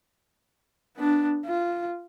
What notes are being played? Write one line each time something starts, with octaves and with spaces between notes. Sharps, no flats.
B3 D4
F4